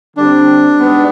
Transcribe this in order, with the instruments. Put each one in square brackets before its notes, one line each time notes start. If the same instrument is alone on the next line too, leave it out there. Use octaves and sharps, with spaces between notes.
[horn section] D3 G3 C4 [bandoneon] D4
[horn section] G#2 G3 B3